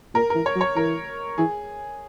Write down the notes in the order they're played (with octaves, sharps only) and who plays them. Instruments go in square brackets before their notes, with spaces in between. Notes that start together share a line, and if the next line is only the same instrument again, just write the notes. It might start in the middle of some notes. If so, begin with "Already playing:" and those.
[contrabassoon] A#2 [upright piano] A#4
[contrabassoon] E3 [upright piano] A#4
[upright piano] C#5
[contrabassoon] F#3
[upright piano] C#5
[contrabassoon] E3 [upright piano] A#4
[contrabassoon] E3 [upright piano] G#4